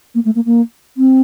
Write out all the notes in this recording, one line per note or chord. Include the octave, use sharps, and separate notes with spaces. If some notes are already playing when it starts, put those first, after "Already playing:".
A#3
A3
A#3
A#3
C4